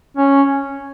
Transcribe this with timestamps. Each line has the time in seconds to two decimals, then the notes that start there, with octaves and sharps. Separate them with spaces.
0.17 C#4